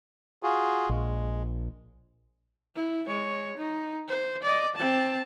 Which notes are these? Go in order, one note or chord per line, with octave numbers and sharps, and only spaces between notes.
F4 F#4 G#4
A#1 G#3
E4
G#3 C#5
D#4
C5
D5 D#5
C4 A5